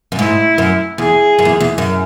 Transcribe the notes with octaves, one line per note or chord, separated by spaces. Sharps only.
F#2
G#2 E4
F#2
E2 G#4
F#2
E2
E2
F#2